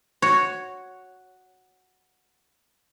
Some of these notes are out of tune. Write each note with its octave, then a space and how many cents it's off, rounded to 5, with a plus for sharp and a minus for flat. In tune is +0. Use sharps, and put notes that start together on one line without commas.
F#4 +0 C#5 +0